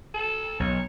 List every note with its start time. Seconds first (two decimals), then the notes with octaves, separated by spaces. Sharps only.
0.14 A4
0.60 B1 C#5